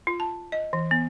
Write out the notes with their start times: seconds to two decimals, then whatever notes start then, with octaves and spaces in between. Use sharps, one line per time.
0.07 F4
0.20 A5
0.52 D#5
0.73 E3
0.91 B3